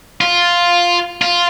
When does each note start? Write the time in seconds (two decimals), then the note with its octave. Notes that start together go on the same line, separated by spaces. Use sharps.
0.21 F4
1.21 F4